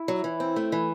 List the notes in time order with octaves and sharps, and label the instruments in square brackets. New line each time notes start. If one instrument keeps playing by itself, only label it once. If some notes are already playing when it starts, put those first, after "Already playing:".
Already playing: [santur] E4
[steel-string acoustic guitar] F#3
E3
C4
A3
E3